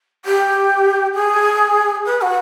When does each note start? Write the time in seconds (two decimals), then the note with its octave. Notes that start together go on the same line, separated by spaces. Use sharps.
0.25 G4
1.14 G#4
2.05 B4
2.21 F#4